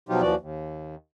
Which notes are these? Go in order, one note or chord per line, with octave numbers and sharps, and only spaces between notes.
B2 F3 F#3 D#4 F4 G4
D#2 E3 F3 F#4 D5
D#2